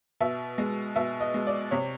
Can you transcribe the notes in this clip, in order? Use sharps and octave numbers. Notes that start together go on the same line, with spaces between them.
B2 E5
G#3
B2 E5
D#5
G#3
D5
C3 C#5